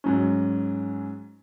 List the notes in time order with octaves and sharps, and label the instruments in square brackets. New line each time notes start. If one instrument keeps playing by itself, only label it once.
[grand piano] G#2 F#3 C#4